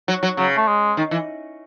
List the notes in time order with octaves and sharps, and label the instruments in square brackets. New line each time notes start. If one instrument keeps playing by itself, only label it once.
[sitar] F#3
F#3
[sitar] C#3 [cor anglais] F#3
[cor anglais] A3
G#3
[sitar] D#3
E3